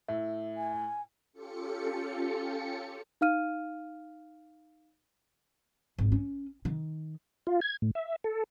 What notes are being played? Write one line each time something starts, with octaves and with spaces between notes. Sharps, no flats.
A2 E5
G#5
C#4 F4 G4 A4 C#7
D#4 F5 F6 D#7
G#1
C#4
D#3
F4
G#6
A2
E5
A4